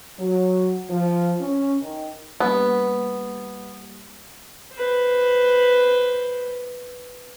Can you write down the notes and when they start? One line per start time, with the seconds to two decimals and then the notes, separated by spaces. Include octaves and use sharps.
0.19 F#3
0.90 F3
1.41 C#4
1.82 D#3
2.40 G3 A#3 B3 G4
4.74 B4 C5